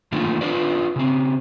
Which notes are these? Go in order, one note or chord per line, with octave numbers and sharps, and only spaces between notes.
D#3 A3 A#3 D4 F4
D4 F4 B4 D5
C#3 C4